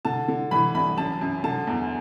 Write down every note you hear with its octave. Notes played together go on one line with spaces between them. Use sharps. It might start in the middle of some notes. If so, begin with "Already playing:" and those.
D3 A5
D3
E3 B5
C2 B5
F#2 A5
F#2
D3 A5
E2